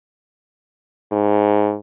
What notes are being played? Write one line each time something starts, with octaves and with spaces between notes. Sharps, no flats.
G#2